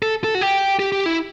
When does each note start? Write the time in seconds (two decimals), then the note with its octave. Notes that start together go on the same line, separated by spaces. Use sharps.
0.02 A4
0.24 A4
0.35 F#4
0.41 G4
0.79 G4
0.92 G4
1.06 E4